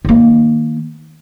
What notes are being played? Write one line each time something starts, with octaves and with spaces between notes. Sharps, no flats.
D#3 A#3